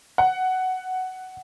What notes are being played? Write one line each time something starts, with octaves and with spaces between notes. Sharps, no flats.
F#5